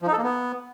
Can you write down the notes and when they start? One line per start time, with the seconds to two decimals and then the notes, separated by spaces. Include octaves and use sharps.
0.02 F3
0.07 D#4
0.12 A4
0.18 A#3
0.23 B3